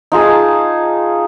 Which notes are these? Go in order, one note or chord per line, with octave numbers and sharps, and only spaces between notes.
D#4 F4 G#4 A5